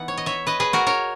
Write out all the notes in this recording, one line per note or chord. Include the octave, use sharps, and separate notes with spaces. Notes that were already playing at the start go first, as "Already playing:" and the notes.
Already playing: E3 B3 D#4 F#5
C#5
D#5
C#5 E5
B4 D#5
G#4 B4
F#4 A#4
A#4 C#5